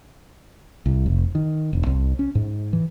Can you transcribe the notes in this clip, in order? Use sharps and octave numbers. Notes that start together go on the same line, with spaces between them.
C2
F1
D#3
E1
C2
C#4
G#2
E3